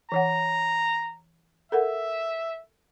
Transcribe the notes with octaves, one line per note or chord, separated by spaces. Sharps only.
E3 C#5 F#5 A#5
A4 A#4 E5 F#5